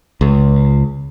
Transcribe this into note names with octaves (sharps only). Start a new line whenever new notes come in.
C#2